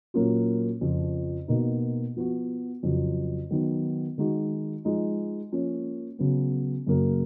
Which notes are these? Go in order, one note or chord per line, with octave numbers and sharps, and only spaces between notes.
A#2 F#3 A#3 C#4 F4
F2 C#3 F3
B2 A#3 D#4
F3 B3 F#4
F2 C#3 F#3
D#3 F#3 B3
D#3 G#3 D#4 F#4
F3 G#3 D#4
F3 A#3 C#4
C#3 F#3 B3
F#2 C#3 F#3 A#3